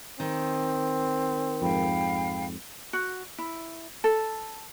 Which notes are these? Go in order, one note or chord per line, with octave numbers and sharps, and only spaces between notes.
D#3 C4
F2 G#2 F5 G5 B5
F#4
E4
A4